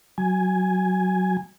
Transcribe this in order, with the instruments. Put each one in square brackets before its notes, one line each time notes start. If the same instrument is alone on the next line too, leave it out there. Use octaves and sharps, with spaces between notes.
[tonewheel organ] F#3 G#5